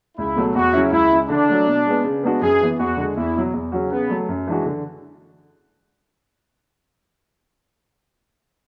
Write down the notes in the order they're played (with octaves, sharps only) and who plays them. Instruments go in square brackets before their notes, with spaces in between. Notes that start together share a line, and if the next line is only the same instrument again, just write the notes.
[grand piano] C#2 [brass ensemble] E4
[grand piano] B2 F#3 A3
[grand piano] E2 [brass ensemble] F#4
[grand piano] C#3 F#3 C#4 E4
[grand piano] C#2 [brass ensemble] E4
[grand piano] C#3 G#3
[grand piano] D3 [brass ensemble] D4
[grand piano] F#3 A3
B2
G#3 B3
C#3
G#3 B3 D4 F#4
[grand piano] F#2 [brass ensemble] G#4
[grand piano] E3 B3
[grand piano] E2 [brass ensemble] F#4
[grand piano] D3 G#3
[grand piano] E2 [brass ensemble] E4
[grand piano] B2 F#3
E2
C#3 F#3 C#4 F#4
[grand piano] C#3 [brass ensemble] B3
[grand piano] F#3 A3
F#2
E3 G#3 D4 F#4
D3